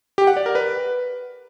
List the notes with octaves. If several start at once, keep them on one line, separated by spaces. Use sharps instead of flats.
G4
F#5
D5
A#4
B4